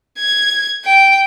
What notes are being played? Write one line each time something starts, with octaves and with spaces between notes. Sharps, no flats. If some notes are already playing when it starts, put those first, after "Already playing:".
G#6
G5